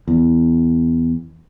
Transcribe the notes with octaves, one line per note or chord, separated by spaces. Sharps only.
E2